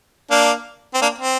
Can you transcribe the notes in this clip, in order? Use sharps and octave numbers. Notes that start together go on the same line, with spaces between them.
A#3 D4
C4
A#3 D4
C4